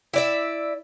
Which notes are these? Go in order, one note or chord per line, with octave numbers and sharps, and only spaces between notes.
E4 D5 E5